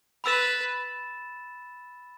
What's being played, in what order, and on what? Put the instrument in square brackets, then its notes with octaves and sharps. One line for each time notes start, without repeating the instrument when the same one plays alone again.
[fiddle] B4 [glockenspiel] B5 E6 A6 E7